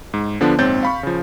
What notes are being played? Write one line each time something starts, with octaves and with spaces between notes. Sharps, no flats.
G#2
D3 F3 B3 D4
A#1 G#2 C4 C#5 G6 A6
F5 B5 C#6
C#3 F3